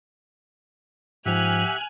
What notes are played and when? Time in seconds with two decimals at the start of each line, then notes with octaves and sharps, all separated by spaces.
1.26 G#2 F3 G4 E5 F#5 G#5 F6 F#6